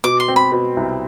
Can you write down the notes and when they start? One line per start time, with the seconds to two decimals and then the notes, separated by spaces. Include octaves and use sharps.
0.04 B2 D6
0.20 C6
0.28 C4
0.36 B5
0.52 B2
0.77 C2